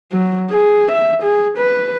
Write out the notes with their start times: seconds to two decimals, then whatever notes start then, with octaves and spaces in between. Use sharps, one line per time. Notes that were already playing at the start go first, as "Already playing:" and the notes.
0.12 F#3
0.51 G#4
0.92 E5
1.23 G#4
1.59 B4